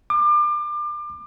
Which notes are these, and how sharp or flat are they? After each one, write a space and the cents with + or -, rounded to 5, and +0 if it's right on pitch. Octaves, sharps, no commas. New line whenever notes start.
D6 +30